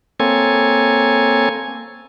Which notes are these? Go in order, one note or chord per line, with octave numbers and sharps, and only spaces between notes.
A#3 C4 A4 C#5 G#5